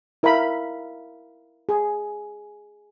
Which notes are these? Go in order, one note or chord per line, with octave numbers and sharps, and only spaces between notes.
E4 A#4 E5 F5 B5
G#4